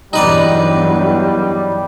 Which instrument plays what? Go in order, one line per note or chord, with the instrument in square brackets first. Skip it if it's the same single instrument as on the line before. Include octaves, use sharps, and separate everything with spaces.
[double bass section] E2 G2 F#3 [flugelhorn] G3 [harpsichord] D#4 B4 D5